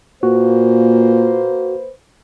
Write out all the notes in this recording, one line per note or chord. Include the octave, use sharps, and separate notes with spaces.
A#2 A#3 F#4 B4 C5